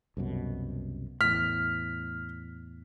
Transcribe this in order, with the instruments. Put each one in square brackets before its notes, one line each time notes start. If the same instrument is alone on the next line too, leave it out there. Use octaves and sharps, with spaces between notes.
[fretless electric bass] C2 F#2 B2
[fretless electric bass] E2 A2 [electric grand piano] F6 B6